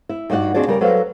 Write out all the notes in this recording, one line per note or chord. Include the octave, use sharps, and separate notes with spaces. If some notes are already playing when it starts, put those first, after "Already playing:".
E4
G2 D#4 F#4 D5 F#5
D#2 C4 D4 F#4 G#4 D5
C#3 G3 A#4
F#3 A4 B4 C5 F5